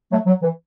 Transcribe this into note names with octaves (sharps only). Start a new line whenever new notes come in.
F#3 A3
F#3
E3